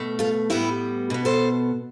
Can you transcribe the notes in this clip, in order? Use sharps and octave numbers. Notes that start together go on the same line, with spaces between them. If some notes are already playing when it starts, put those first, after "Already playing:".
Already playing: B2 A3
F4 A4
A2 G3 B3 E4 G4
B2 B3
A4 C5